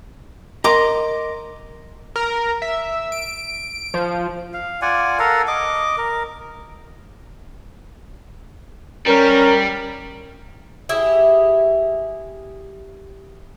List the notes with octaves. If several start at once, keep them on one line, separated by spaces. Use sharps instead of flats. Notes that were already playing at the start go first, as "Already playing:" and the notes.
A#4 D#5 A#5 C6 D6
A#4
E5
D7
F3
F5
F4 D5 F#5 G#5
A4 A#4 F5 F#5
D#5 D6
A#4
G3 C#4 A#4
E4 G4 G#4 E5